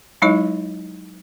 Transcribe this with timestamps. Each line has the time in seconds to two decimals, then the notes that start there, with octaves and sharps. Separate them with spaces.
0.22 F#3 G#3 D#4 E4 C#5 D#5